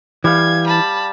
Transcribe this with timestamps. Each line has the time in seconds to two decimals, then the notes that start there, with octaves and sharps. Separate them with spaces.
0.24 E3 G3 F5 G#6
0.67 A5 B5